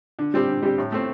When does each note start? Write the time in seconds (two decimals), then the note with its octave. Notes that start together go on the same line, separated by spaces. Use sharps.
0.19 D3
0.34 G3 C4 G4
0.49 D3
0.63 G3 C4 G4
0.78 A2
0.92 A3 C4